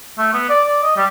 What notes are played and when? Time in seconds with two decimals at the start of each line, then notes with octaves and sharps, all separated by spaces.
0.18 A3
0.33 B3
0.49 D5
0.67 D5
0.83 D#5
0.96 G3